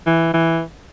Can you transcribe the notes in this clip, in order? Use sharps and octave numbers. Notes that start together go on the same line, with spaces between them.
E3
E3